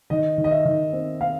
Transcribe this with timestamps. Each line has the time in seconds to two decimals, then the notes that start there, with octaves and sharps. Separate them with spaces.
0.10 D#3 D#5
0.38 D#3
0.44 D#5
0.51 E5
0.65 D#3
0.93 C4
1.21 C4 F5